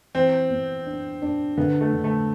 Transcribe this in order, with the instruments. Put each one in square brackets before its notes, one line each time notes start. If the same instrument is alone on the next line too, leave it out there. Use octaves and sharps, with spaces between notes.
[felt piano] E3 [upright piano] C4
[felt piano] B3
D4
D4
[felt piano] D3 [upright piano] B3
[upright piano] A3
[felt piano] D3
[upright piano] A3